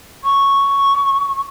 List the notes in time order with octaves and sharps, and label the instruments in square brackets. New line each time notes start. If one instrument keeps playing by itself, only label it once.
[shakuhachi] C#6